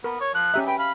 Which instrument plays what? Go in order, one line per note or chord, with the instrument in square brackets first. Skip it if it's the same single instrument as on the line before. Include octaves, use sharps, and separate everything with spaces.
[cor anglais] B3 [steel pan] A#4
[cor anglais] C#5
[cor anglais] F3 [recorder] F#6
[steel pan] C#4 G4 E5 [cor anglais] D#4
[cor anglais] B4 [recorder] G5
[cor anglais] F5 [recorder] B5